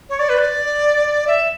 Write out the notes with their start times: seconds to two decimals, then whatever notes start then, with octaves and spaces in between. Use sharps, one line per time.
0.09 C#5
0.19 D5
0.29 B4
0.39 D5
1.27 E5